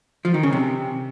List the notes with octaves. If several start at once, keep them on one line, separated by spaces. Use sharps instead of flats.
F3
D#3
C#3
C3